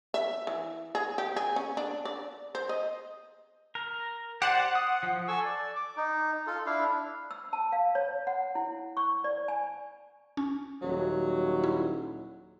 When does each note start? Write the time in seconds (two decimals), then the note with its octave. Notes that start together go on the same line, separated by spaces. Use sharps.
0.14 E5
0.47 E3
0.95 G#4
1.18 G4
1.36 G#4
1.56 C#4
1.77 D4
2.05 D5
2.55 C5
2.69 D#5
3.75 A#4
4.42 G4 C5 D5 F#5
4.75 D#6
5.03 F3
5.28 A4 G#5 C#6 E6
5.45 D5
5.76 D6
5.97 D#4
6.47 F4 A4
6.66 D4 E4 F5
7.31 E6
7.53 A5
7.72 F5
7.95 C#5
8.27 F#5
8.55 E4
8.97 C#6
9.24 D5
9.48 G#5
10.37 C#4
10.82 D#1 F#3
11.64 E4